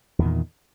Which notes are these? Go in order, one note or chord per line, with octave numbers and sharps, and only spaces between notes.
E2 A#2 D#3